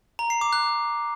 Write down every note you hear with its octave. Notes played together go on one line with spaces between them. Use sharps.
A#5
C7
D6
F#6